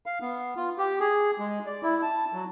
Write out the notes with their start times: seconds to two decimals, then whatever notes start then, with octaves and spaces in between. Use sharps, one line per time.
0.06 F5
0.21 B3
0.56 F4
0.78 G4
1.00 G#4
1.39 G#3
1.66 D5
1.83 E4
2.02 A5
2.33 F#3